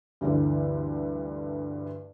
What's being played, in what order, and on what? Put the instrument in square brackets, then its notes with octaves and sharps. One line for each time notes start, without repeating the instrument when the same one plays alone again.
[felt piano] D2 G2 D3 E3